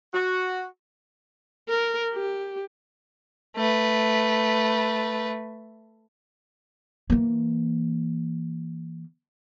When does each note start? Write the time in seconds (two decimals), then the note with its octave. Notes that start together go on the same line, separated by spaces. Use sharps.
0.14 F#4
1.68 A#4
2.13 G4
3.56 A3 B4
7.10 E3 A#3